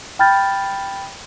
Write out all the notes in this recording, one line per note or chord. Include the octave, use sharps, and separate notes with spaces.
G5 B5 F6 G6 A6